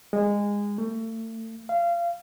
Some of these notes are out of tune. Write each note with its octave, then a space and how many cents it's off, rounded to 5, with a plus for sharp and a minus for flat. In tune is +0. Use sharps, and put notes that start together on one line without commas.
G#3 -20
A3 +35
F5 -25